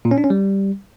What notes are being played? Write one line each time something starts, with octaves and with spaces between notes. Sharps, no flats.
A#2
C#4
D4
C#4
G3